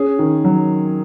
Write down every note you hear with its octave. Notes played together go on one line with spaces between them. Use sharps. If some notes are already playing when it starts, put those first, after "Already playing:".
Already playing: C#4 G#4
D#3
F#3